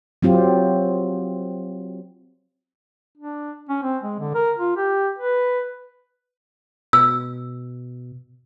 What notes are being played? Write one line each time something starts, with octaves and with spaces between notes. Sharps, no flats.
F#3 C4 F4 G4
D4
C#4
C4
G#3
D3
A#4
F4
G4
B4
B2 E6